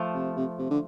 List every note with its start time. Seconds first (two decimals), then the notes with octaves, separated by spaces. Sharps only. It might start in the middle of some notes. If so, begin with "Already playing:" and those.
Already playing: F3 A3
0.14 C3
0.37 C3
0.59 C3
0.70 D3